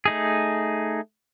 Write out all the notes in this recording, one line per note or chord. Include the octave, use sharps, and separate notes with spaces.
A3 D#4 G#4